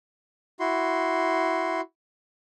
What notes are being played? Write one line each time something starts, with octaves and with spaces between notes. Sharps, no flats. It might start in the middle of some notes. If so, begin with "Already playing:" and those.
E4 F#4 C6